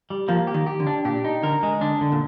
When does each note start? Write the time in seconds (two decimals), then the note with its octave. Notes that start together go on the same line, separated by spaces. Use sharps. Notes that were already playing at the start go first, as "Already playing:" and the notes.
0.10 G3
0.28 F3 A#3
0.47 G4
0.54 D#3
0.66 G4
0.80 D3
0.87 D4
1.05 A#2 G4
1.24 D#4
1.43 D3 A#4
1.63 G#3
1.81 D3 D4
2.01 D3
2.12 A#2